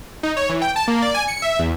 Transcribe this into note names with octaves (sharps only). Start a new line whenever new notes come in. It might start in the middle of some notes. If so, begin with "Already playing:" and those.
D#4
C#5
E3
G5
A5
A#3
D5
G#5
C#7
E5
E2